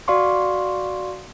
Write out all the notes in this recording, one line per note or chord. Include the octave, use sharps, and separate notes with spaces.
F#4 D5 F5 C6 C#6